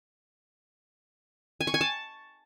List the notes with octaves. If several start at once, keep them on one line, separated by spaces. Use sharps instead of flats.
G#5
C#6
G#5
A5